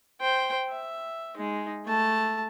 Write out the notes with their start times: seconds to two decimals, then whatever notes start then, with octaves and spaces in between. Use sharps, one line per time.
0.20 C5 G5
0.69 E5
1.36 G#3 D#4
1.85 A3 A5